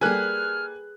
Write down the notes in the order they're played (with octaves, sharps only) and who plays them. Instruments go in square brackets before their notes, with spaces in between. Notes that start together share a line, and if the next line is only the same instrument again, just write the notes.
[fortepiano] G3 A#3 A4 [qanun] G#4 B4 [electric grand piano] G#5 F#6 [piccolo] F6